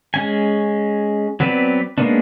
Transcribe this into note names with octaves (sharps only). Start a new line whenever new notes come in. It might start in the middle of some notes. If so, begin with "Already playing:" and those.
G#3 C#4 G#5
F#3 B3 C4 B4 D5
G#3 A#3 B3 C#4 D4